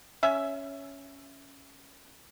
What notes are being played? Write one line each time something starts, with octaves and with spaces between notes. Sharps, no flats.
C#4 E5